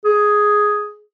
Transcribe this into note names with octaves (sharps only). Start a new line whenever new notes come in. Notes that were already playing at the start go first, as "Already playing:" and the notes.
G#4